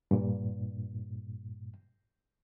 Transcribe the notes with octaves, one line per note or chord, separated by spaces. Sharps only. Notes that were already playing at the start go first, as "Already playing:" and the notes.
G2 A#2